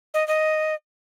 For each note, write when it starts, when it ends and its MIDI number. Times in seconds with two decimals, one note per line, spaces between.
0.14 0.26 75
0.28 0.74 75